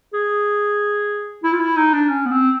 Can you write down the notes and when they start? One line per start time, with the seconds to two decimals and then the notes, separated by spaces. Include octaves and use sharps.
0.13 G#4
1.44 E4
1.53 F4
1.59 E4
1.77 D#4
1.93 D4
2.09 C#4
2.26 B3
2.31 C4